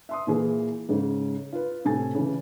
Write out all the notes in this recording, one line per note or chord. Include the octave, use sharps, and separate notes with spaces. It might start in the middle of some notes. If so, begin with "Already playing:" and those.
E5 C6 D#6
A#2 E3 G#4
G#2 C#3
F4 B4
A2 C3 A3 G#5 A6
C#3 E3